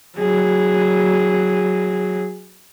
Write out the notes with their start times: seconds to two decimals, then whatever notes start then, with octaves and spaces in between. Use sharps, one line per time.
0.19 F#3 G#4